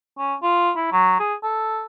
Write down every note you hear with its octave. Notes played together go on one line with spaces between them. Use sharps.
C#4
F4
E4
F#3
G#4
A4